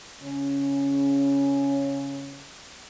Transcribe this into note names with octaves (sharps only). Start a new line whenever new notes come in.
C#3 C#4